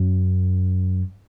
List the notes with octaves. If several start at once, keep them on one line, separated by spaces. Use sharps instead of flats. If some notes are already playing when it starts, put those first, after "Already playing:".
Already playing: F#2